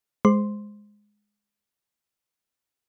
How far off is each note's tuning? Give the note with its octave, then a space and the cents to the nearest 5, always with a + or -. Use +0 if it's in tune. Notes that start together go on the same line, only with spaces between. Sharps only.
G#3 +0 C5 -10 C6 +0